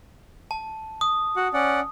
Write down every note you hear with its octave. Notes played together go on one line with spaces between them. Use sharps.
A5
D#6
F#4 F#5
C#4 D5 F#5